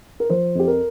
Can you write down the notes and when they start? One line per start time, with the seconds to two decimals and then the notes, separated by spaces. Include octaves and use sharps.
0.20 A#4
0.30 F3 C5
0.55 F2 G4
0.68 A#4